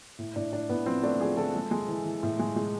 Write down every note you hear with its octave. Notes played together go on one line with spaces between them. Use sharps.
A2
A2 D4
A2 D4
A2 B3
F3 C4
A3 D4
F3 G#4
F3 A4
G#3
G#3
E3
E3
A2
G#3
G#3